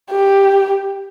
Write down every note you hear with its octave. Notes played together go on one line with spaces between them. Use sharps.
G4